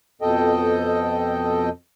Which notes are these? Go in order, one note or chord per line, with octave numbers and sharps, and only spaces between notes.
F2 B2 A4 D#5 G5